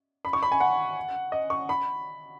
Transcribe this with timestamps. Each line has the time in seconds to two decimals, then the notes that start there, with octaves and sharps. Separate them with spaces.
0.25 B5
0.33 C#6
0.43 B5
0.52 G#5
0.60 F#5
1.32 D#5
1.50 C#6
1.69 B5